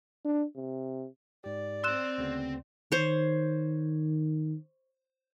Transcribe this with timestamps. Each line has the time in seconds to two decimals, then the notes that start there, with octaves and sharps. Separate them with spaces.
0.25 D4
0.56 C3
1.44 G#2 G4 D5
1.84 C4 C6 E6 F#6 E7
2.18 D2 C#3 B3
2.92 D#3 C5 C#5